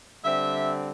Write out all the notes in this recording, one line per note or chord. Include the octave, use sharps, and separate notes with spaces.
D3 G3 C4 E5